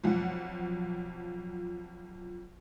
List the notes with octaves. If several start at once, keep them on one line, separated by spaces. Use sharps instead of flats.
B1 F2 F3 F#5